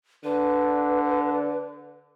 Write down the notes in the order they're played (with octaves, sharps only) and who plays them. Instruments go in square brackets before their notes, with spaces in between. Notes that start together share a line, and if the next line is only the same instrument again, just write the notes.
[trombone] D3 [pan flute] B4